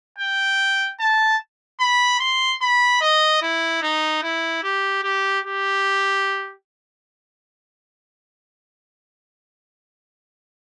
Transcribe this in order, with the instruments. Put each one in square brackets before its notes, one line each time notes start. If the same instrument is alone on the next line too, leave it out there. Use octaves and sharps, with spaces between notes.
[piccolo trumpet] G5
A5
B5
C6
B5
D#5
E4
D#4
E4
G4
G4
G4